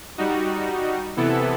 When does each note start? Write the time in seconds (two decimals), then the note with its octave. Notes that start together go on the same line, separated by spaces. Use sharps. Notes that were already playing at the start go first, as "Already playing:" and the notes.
0.18 G3 D#4 F#4
1.17 C3 E3 B3 E4 A4